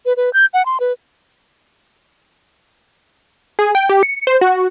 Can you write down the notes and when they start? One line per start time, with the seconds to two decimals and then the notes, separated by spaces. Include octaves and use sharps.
0.06 B4
0.17 B4
0.33 G6
0.54 F#5
0.66 C6
0.80 B4
3.59 G#4
3.75 G5
3.89 G4
4.03 C#7
4.27 C5
4.41 F#4